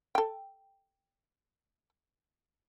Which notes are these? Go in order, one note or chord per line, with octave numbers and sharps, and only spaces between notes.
A4 G5